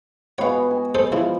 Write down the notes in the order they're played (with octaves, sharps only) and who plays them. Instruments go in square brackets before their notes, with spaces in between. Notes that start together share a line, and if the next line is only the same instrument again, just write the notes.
[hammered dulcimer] G#3 B3 F#4 [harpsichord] C#5 F5
[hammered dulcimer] G#5
[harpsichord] A4 C5 D#6
[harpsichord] C#3 E4 [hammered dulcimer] F3